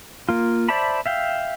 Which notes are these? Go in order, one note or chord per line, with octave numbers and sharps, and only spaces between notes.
A#3 F4
C5 D5 E5 A5 B5
E5 F5 G5